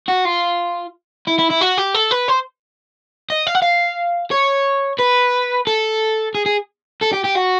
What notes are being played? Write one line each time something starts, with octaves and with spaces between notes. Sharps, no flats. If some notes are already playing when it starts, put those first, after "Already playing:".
F#4
F4
E4
E4
E4
F#4
G4
A4
B4
C5
D#5
F5
F#5
F5
C#5
B4
A4
G#4
G#4
A4
G4
G4
F#4